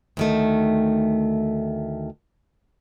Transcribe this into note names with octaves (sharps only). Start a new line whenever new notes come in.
D2 D#3 A3